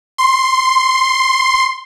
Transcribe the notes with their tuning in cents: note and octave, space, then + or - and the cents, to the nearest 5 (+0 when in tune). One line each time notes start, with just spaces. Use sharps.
C6 +5